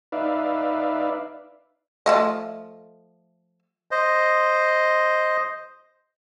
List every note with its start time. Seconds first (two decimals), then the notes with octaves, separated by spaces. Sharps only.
0.12 D#4 B4 D5 E5 F5
2.06 F3 A3 D#5
3.91 C5 D#5